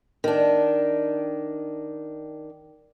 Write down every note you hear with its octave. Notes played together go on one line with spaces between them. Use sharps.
D#3 D4